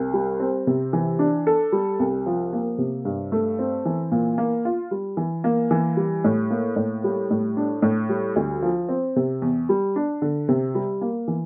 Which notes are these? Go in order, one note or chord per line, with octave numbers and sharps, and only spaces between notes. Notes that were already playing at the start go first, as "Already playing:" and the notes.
Already playing: C2
G3
C4
C3
E3
D4
A4
G3
C2
F3
A#3
C3
G2
A3
C4
E3
A#2
A#3
F4
G3
E3
A#3
E3
G3
A2
A#3
A2
G3
A2
D4
A2
G3
D2
F3
C4
C3
E2
G3
D4
D3
C3
G3
A#3
E3